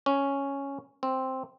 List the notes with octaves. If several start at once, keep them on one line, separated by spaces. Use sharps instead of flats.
C#4
C4